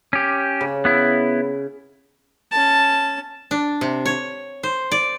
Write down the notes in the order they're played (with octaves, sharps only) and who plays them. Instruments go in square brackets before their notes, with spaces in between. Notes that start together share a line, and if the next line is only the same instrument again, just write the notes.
[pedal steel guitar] C#4 G4
[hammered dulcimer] C#3
[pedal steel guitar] B3 E4
[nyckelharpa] C#4 A5
[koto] D4
C3
C#5
C5
D5